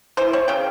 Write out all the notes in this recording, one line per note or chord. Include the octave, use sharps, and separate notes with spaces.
E3 C5
C4 C#5
C#3 G5